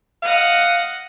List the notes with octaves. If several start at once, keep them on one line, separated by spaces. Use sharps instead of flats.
D#5 F5 F#5